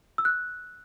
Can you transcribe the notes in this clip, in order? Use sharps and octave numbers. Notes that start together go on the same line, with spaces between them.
E6
F#6